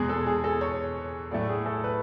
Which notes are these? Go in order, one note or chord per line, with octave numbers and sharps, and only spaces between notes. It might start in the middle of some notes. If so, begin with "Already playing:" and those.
Already playing: E2 B2 G#3 G#4
A4
G#4
A4
C#5
A2 F#3 A3 D5
G#4
A4
B4